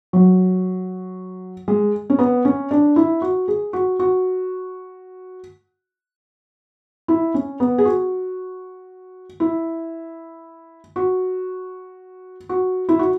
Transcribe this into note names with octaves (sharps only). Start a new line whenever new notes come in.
F#3
G#3
C#4
B3
C#4
D4
E4
F#4
G#4
F#4
F#4
E4
C#4
B3
G#4
F#4
E4
F#4
F#4
E4
F#4